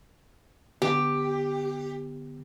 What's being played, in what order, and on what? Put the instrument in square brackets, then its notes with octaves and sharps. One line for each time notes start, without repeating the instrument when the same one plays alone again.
[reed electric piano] D3 B3 [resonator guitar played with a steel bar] G4